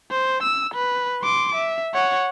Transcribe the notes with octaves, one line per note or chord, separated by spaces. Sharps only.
C5
E6
B4
C6 D6
E5
C#5 F#5